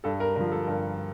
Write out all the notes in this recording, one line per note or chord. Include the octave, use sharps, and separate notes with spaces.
G2 A4
A#4
D3 F3 A#4
A4
G2 A#4